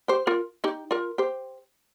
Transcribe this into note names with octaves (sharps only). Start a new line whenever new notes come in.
G4 C5
F4 A#4
D#4 G4
F4 A#4
G4 C5